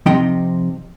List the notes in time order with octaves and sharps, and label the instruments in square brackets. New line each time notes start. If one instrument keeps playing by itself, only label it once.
[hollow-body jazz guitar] C3 F3 C4 D#4 D#5 G5